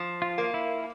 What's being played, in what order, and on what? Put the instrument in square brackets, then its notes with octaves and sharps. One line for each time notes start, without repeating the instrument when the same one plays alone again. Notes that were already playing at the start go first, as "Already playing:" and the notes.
Already playing: [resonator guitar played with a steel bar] F3
[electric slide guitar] F4
[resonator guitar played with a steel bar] A#3
[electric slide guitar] E4